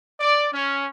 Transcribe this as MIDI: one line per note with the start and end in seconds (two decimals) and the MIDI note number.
0.20 0.49 74
0.53 0.87 61